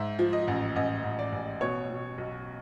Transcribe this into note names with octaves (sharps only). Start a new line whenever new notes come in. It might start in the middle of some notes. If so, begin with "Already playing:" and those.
Already playing: G#2 E5
F3
D#5
A1
A1 D#5
A1
D5
A1
B2 C#5
B2
B1